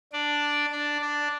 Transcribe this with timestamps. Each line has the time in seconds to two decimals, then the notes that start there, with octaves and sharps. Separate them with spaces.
0.12 D4 D5
0.72 D4 D5
1.01 D4 D5